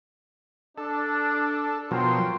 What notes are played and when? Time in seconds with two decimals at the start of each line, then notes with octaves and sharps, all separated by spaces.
0.78 D4 A4
1.91 B2 F3 F#3 A#4 G5 C6